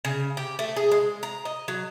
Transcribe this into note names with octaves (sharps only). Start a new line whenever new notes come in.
C#3
G4
A3
G#4
G#3
A#5
D#5
F#3